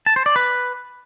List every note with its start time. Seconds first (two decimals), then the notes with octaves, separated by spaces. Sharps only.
0.06 A5
0.16 C5
0.26 D5
0.36 B4